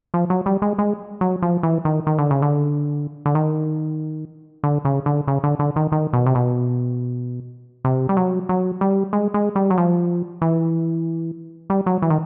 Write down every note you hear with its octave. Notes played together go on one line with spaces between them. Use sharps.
F3
F#3
G3
G#3
G#3
F#3
F3
E3
D#3
D#3
D3
C#3
D3
D3
D#3
D3
C#3
D3
C#3
D3
D3
D#3
D#3
B2
C3
B2
C3
G3
F#3
F#3
G3
G#3
G#3
G3
F#3
F3
E3
G3
F#3
E3
D#3